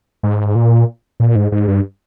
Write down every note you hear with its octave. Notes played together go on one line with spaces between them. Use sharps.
G#2
A#2
A#2
G#2
G#2
G2